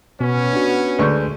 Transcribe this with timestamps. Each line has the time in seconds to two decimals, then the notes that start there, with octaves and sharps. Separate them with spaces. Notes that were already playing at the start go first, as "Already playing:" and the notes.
0.21 B2 B3 C#4
0.53 D4 F#4
0.99 D2 G#3 B4 D5 C#6 G6